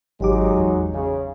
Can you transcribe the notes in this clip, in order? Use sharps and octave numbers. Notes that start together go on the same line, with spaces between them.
G#1 F#3 G#3 D#4 G4 D6
E2
C#3